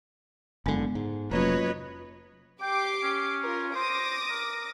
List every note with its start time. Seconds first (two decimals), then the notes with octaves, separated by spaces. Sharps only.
0.66 F#1 D3 G#3 B3
0.95 G#2
1.31 F1 F#3 A#3 C#4 F4 B4 C#5 D#5
2.62 G4 G5 D6 C7
3.03 C#4
3.44 F4 A#4
3.75 C5 D6 D#6 A#6
4.30 A#4